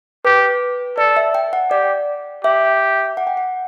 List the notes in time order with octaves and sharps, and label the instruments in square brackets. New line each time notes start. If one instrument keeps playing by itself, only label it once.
[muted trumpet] G4 [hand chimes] B4
[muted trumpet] A4 [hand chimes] D5
[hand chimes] E5
G5
F#5
[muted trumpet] G4 [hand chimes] D5
[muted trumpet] G4 [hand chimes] E5
[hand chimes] F#5
G5
F#5